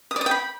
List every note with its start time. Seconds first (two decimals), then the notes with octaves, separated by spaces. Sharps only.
0.11 D#6
0.16 D5
0.21 D#6
0.26 G5
0.31 B5